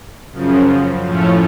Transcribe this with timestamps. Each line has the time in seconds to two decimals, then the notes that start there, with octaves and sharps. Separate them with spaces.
0.32 F#2 C#3 F3
1.03 A2 F3 A3 C#4